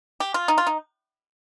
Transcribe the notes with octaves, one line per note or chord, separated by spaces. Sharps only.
G4
F4
D#4
F4
D#4